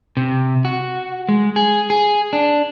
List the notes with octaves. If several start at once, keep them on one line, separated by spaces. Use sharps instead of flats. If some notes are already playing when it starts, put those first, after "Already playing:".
C3
F#4
G#3
G#4
G#4
D4